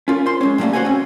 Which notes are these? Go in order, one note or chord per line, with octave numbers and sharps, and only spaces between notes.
C#4 F4 A#4
C5 C6
G#3 C4 C#4
A2 F#3 G3 A3 A#3
F#4 A#4 C5 C#5 F#5 G#5
C4 C#4